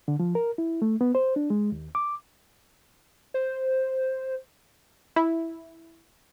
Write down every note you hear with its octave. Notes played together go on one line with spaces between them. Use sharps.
D3
F3
A#4
E4
A3
B3
C5
D4
G#3
D#2
D6
C5
E4